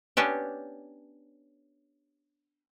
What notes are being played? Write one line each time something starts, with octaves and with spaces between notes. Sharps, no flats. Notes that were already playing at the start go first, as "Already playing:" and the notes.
B3 C#4 D4 G4